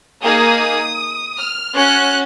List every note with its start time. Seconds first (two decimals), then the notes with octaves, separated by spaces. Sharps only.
0.22 A#3 D#4 G#4 D#6
1.36 F6
1.74 C#4 F#4 F#6